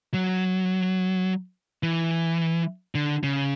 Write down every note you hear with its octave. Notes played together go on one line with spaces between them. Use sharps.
F#3
E3
D3
C#3